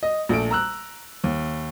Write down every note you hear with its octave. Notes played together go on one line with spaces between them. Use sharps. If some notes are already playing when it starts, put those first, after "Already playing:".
D#5
A#1 A3 D7
A#5 E6 F#6
D#2